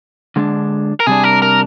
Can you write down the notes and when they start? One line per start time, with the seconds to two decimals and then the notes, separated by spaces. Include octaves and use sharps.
0.36 D3 G#3 D4
1.00 A#4
1.07 C3 G3 D4 G#4
1.24 A#4
1.42 A#4